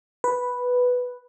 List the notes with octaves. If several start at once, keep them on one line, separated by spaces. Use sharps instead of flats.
B4